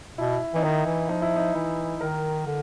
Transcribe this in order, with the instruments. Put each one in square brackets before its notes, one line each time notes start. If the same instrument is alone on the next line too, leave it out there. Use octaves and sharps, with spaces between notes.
[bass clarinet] B2 [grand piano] E4
[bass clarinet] E3 [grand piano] D#4
[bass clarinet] D#3 [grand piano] E4
[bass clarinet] E3
[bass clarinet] F3 [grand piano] D#4
[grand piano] E4
D#4
[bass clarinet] E3 [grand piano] E4
[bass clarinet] D#3 [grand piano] A#4
[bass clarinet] D3